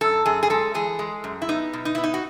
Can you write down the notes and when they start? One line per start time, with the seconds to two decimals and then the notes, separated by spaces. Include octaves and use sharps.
0.01 F#2 A4
0.26 F#2 G#4
0.43 G#4
0.50 G#3 A4
0.74 E3 G#4
0.99 G#3
1.24 F#2
1.42 E4
1.49 B3 D#4
1.73 B2
1.85 D#4
1.95 B3 E4
2.04 D#4
2.14 F#4